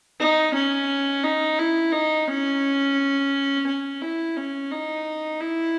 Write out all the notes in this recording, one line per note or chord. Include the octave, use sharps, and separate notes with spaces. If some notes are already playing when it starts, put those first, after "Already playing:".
D#4
C#4
D#4
E4
D#4
C#4
C#4
E4
C#4
D#4
E4